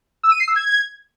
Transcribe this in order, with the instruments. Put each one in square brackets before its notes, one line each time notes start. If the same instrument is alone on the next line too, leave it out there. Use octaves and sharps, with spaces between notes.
[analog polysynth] E6
D#7
C7
E6
G#6